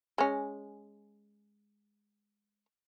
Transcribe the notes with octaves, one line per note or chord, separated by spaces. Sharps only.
G#3 C#4